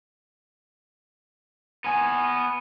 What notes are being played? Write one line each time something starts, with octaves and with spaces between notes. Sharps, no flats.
B3 G#5